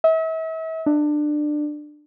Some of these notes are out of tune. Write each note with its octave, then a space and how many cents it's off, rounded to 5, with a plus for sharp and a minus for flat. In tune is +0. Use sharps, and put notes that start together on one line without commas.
E5 -40
D4 +20